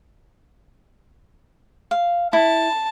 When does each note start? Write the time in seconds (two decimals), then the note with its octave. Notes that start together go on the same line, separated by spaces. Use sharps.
1.91 F5
2.33 E4 A5